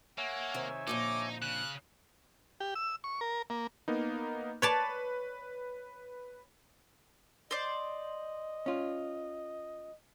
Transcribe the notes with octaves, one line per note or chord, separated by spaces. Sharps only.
A#3 C#5 E5 F#5 G#5
C3 D#3 C4
F2 A#2 D3 D#4 D6
C#3 F#6
G4
E6
C#6
A#4
A#3
A#3 B3 D#4
B4 C#5 D5 A5
C5 D5 D#5
C#4 F4